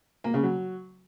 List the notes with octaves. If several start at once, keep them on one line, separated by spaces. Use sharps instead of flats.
A#3
C#3
F#3